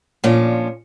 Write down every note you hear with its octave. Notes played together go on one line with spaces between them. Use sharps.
A#2 F3 C#4 D4